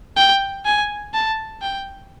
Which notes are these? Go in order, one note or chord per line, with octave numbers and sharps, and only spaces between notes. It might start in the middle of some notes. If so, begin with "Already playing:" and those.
G5
G#5
A5
G5